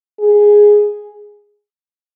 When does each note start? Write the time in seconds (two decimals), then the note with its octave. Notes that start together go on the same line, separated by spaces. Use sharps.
0.19 G#4